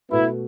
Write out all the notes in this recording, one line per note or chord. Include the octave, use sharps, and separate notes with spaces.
B2 A3 B3 E4 F#4 B4